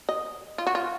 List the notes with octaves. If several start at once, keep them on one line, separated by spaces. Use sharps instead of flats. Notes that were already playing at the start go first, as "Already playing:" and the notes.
D#5
F4
F#4
F4